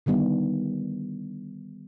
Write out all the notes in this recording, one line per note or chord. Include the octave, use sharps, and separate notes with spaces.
D3 D#3 G3 B3